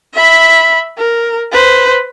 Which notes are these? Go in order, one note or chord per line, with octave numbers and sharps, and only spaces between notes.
E5 B5
A#4
B4 C5